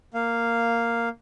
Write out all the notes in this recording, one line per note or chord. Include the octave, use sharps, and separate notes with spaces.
A#3 F5